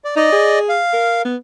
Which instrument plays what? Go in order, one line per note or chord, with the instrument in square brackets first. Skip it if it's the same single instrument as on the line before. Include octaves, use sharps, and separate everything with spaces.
[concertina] D5
[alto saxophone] D#4 [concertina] D5 D#5
[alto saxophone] G#4
[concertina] F5
[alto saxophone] A#4
B3